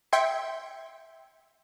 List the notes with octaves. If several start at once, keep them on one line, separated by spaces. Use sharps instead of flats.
E5 G5 C6 G#6 C#7